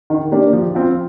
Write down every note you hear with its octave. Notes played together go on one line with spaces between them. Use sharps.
D#3
A#3 D4 G4
F3
C4 F4